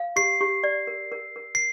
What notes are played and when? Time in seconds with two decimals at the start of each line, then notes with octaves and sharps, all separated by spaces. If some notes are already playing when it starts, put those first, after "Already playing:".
Already playing: F5
0.16 G4 C7
0.41 G4
0.64 D5
0.87 A#4
1.12 A#4
1.36 A#4
1.55 C7